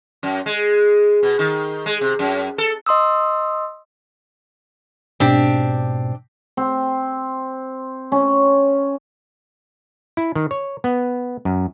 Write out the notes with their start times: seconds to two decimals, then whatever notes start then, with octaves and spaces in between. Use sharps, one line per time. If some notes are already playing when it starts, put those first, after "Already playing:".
0.23 F#2
0.46 G#3
1.23 B2
1.39 D#3
1.86 G#3
2.01 C3
2.19 F#2
2.58 A4
2.86 D#5 C6 D#6 E6
5.20 G#2 B2 C4 D4 G4
6.57 C4
8.12 C#4
10.17 E4
10.35 D#3
10.51 C#5
10.84 B3
11.45 F#2